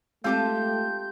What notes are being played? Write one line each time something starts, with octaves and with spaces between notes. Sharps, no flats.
G#3 A3 C4 F4 G4 A5 D6 G6